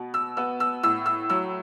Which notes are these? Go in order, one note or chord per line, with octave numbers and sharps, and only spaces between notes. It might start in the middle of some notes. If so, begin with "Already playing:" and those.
Already playing: B2 B3
E6
B3 E6
E6
A2 E6
E6
F#3 E6